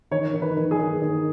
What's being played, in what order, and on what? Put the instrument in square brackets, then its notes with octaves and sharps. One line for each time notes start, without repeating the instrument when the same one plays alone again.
[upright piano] D#3 [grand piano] C#5
[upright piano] D#3
[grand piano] B4
[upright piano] D#3
[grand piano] G#4
[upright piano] D#3
D#3